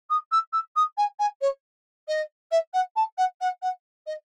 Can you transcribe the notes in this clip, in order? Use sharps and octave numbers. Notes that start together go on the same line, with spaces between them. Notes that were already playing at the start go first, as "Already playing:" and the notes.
D#6
E6
E6
D#6
G#5
G#5
C#5
D#5
E5
F#5
A5
F#5
F#5
F#5
D#5